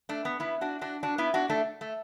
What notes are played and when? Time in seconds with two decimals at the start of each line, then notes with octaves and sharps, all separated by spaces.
0.09 A3 D4
0.25 B3
0.40 B3 E4
0.61 D4 F#4
0.81 D4 F#4
1.03 D4 F#4
1.18 B3 E4
1.34 D4 F#4
1.49 A3 D4
1.81 A3